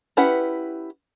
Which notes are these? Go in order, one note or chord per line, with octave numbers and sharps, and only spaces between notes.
C#4 E4 G4 B4 F#5